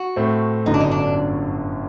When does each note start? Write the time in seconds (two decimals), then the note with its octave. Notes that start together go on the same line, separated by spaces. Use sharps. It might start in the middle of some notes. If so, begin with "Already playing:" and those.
Already playing: F#4
0.16 A2 A3 C4
0.66 G1 F#2 D3 D#4
0.74 D4
0.80 D#4
0.91 D4